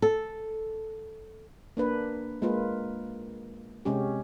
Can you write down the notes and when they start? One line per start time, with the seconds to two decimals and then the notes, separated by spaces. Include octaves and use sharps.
0.02 A4
1.77 A#3 D4 B4
2.42 G#3 A#3 F4 B4
3.85 C3 G#3 C#4 G4